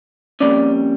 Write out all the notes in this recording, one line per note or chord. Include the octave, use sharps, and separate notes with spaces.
F2 E3 G3 A#3 C#4 D5